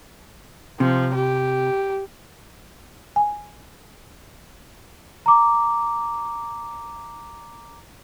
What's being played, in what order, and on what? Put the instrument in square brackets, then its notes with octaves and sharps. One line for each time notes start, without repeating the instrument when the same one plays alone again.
[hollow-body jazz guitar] C3 [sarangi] F3
[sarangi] G4
[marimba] G#5
[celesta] A#5 D6